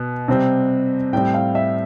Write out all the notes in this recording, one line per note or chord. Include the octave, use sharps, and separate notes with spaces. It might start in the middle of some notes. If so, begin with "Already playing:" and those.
Already playing: B2
C3 G3 C4
A2 G3 C4 G5
F5
E5